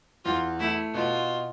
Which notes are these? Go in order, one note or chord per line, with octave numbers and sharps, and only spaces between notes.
E2 F4
A3 E4
B2 F4